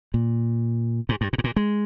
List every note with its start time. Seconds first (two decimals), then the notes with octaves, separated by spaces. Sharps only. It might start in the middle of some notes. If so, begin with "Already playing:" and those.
0.14 A#2
1.09 G#2
1.21 G2
1.33 A#2
1.38 G#2
1.44 A#2
1.56 G#3